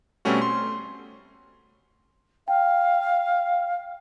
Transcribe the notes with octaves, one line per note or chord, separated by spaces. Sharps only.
B2 G3 A3 C4 C#4 F#4
C6
F5 G5